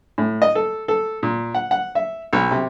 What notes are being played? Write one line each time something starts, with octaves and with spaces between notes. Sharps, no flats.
A2
D#5
A4
A4
A#2
F#5
F#5
E5
B1
C3